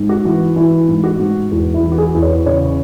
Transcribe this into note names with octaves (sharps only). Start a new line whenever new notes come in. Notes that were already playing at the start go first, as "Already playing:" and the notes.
Already playing: G#2
F#4
E3
E3 E4
G#2
F#4
G#2
E2
E4
E3
F#4
G#4
E2
C#5
C#3 C#5